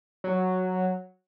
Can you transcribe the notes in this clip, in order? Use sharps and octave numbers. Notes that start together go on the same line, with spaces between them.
F#3